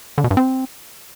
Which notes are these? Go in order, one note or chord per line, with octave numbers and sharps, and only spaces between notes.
D3
B2
G2
C4